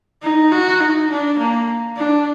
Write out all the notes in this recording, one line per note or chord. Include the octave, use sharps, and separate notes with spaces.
D#4
F#4
D#4
D4
A#3
D4